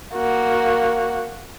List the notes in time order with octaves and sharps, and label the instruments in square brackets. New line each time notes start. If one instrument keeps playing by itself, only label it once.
[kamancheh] A#3 F#4